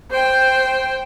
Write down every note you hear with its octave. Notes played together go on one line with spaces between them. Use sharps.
C5 G5